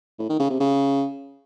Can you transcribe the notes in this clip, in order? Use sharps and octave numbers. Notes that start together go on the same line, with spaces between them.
A2
D#3
C#3
C3
C#3